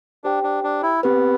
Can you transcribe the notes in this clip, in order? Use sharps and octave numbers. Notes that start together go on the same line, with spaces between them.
D4 G4 C5 G5
D4
D4
E4
B3 C4 G4 B4